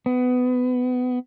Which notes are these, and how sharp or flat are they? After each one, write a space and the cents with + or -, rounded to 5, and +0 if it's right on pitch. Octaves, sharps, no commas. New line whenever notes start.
B3 +20